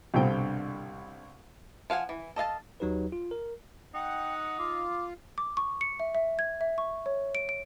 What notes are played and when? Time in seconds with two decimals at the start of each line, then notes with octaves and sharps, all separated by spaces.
0.14 C2 G2 B2 D3 C4 G5
1.90 F3 F5 F#5 G#5
2.09 E3
2.36 A4 D#5 F5 A5
2.80 D#2 F#3 D#4 G4 B4
3.12 F4
3.31 A#4
3.94 D#4 F#5 G5
4.59 F4 D6
5.38 D6
5.57 C#6
5.81 C#7
6.00 E5
6.15 E5
6.39 G#6
6.61 E5
6.78 C#6
7.06 C#5
7.35 D7
7.49 D7